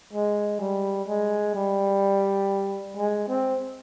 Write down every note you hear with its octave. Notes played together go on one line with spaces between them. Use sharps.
G#3
G3
G#3
G3
G#3
C4